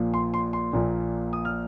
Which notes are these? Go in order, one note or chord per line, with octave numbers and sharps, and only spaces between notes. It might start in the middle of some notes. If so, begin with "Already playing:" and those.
Already playing: A#1 A#2 F3
C6
C6
C6
A#1 A#2 F3
D#6
F6